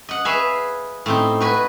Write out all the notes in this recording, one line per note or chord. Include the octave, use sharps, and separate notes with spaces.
D#5 F#5
G#4 B4 C#5 E5 F5 G#5
A2 C4 D#4
F#4 B4 G#5